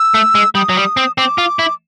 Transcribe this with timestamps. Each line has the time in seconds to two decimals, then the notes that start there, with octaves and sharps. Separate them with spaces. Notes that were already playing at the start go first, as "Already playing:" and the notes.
Already playing: E6
0.14 A3
0.35 G#3
0.55 G3 D#6
0.69 F#3
0.77 G3
0.97 C4
1.18 C4 D6
1.38 F4
1.59 E4